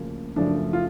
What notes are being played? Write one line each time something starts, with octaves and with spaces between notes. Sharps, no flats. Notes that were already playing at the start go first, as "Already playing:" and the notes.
Already playing: D2 C#3 F3 A#3
F#2 C#3 F3 A3 D4
F4